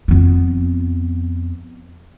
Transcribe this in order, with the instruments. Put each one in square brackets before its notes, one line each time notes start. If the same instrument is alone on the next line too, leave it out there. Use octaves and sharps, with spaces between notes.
[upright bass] F2 B3